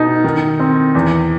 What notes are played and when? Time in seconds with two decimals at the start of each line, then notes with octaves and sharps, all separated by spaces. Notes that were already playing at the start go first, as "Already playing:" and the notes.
Already playing: B2 D#4
0.24 D#3
0.60 C4
0.95 E2